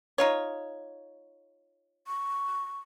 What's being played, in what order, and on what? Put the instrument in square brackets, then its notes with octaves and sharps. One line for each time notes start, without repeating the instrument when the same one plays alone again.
[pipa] D#4 F4 C#5
[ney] C#6